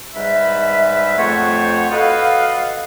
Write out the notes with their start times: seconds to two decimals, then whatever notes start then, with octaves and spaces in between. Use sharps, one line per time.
0.15 G#2 G3 B4 E5
1.18 F2 A3 C5 C#5 F#5
1.91 F#4 A4 B4 D#5 F5